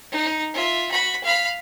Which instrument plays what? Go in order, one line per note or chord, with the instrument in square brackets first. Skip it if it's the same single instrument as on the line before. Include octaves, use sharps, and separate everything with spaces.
[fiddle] D#4
F4 E5
F#4 B5
F5 B5